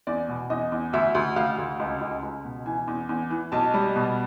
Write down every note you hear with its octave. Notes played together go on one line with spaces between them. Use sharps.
E2 D5
B2
E2 D#5
E2
D2 E5
D2
D2 F5
D2
C#2
C#2
C#2
B2
E3 G#5
E2
E2
E3
B1 A5
G3
B2